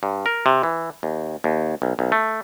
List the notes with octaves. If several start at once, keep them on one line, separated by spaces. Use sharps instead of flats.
G2
A#4
C3
E3
D#2
D#2
B1
B1
A3